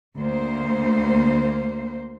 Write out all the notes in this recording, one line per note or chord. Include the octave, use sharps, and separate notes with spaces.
D2 A#3 C5